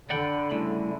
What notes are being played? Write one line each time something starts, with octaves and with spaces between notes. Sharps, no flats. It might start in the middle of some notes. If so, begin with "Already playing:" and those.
D3 D5 F#5 G5 B5
D2 A2 C#3 G3 A3 E4